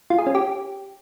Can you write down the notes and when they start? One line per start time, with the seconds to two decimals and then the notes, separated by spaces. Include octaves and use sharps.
0.10 F4
0.18 G#4
0.27 C#4
0.35 G4